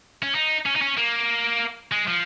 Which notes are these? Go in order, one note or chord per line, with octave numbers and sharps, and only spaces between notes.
C#4
D#4
C#4
D#4
C#4
A#3
G#3
F3